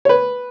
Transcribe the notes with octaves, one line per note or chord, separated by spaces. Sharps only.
C#5
B4